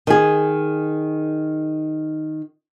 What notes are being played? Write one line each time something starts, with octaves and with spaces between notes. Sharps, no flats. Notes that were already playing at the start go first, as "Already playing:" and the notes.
D#3 G#4